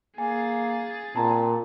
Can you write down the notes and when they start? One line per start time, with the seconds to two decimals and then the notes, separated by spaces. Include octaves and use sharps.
0.18 A#3 G#4 G#5 A6
1.16 A#2 C4 A5 A#5